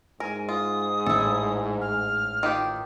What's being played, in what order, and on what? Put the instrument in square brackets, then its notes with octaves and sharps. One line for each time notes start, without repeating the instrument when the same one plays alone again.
[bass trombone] G#2 [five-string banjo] A#4 [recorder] G#5
[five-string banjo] F4 [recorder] D#6
[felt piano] A1 [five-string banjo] E4 A4
[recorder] F6
[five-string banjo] D#3 F4 G4